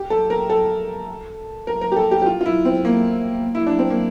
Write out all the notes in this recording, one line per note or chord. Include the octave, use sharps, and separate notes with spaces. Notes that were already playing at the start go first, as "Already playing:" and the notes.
Already playing: G4
A4
A#4
A4
A#4
A#4
G4
A4
G4
G4
F4
F4
E4
C4
A#3
E4
D4
C4
A#3